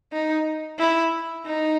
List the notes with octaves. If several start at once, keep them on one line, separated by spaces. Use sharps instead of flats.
D#4
E4
D#4